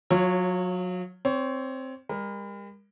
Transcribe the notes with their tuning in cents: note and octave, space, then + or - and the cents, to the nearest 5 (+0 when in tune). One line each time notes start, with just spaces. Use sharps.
F#3 -25 F4 +0 C#5 +0
C4 +0 C#5 +20
G3 +45 A#4 +15